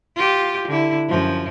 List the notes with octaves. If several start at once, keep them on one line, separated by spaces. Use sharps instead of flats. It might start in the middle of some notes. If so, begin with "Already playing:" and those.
F4 G4
D3 E4
F#2 F3